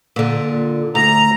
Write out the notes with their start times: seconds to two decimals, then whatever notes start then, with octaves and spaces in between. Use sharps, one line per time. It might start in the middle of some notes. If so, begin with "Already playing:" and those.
0.16 A#2 D3
0.95 D2 A#5